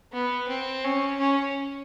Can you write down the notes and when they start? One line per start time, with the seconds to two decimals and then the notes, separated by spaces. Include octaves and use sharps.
0.12 B3
0.48 C4
0.84 C#4
1.20 C#4